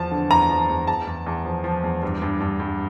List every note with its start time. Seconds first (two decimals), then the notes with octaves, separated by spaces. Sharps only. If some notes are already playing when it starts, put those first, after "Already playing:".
Already playing: E2 F3 A5
0.11 D3
0.30 E2 A#5
0.50 F3
0.69 E2
0.87 E2 A5
1.07 E2
1.26 E2
1.45 F3
1.64 F3
1.84 E2
2.03 G2
2.22 G2
2.40 G2
2.60 G2